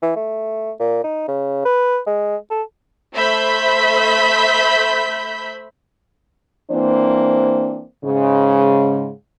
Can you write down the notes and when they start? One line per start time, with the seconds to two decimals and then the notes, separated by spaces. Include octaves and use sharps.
0.02 E3
0.16 A3
0.80 A#2
1.04 D#4
1.28 C#3
1.65 B4
2.07 G#3
2.51 A4
3.15 A3 C5 E5 B5 G6 B6
6.71 E3 A#3 C4 D4 C5
8.05 G#2 C#3 G#3